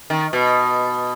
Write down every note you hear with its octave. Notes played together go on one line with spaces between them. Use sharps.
D#3
B2